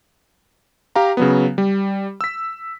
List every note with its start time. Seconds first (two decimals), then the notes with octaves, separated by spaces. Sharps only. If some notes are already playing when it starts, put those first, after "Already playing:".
0.96 G4 F5 A#5
1.17 C#3 F#3 B3
1.58 G3
2.21 E6 B6